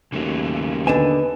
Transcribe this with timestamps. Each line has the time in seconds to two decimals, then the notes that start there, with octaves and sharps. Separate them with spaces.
0.13 D#2 C#3 F#3 A3
0.87 D3 B3 D#5 G#5 E7